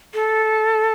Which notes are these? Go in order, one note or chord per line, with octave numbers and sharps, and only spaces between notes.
A4